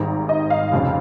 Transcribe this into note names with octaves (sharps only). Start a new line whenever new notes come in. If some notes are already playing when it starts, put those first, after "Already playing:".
Already playing: G#1 G#2 D#3 G3 A#5
D#5
F5
F1 F2 C#3